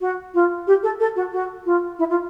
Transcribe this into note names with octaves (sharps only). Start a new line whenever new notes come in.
F#4
F4
G4
A4
A4
F#4
F#4
F4
E4
F4